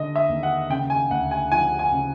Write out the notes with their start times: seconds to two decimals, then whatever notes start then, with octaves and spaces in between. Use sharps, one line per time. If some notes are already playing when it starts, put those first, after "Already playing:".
Already playing: D3 D#5
0.16 E5
0.29 D#2
0.43 F#5
0.70 C#3 G5
0.90 G#5
1.11 D2 F#5
1.31 G#5
1.51 F3 G#5
1.79 G#5
1.92 C#3